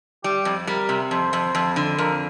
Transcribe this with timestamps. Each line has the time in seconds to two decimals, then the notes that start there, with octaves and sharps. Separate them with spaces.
0.24 G3 G4
0.45 F2
0.67 G3 A#4
0.89 C3
1.11 F2 C5
1.33 F2
1.55 F2
1.76 D3
1.98 F2 A#4